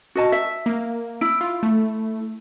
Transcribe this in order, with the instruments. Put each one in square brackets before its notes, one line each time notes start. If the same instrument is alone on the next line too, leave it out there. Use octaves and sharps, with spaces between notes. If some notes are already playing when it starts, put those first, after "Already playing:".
[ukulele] F#4 D#5 A5
E5
[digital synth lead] A#3
[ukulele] E4 [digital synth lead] D7
[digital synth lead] F4
A3